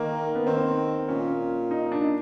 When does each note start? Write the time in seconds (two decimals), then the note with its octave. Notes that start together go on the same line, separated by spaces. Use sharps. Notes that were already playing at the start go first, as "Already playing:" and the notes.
Already playing: D#3 A#3
0.35 B3
0.46 D#3 C4
1.08 A#2 C#4
1.71 D#4
1.92 D4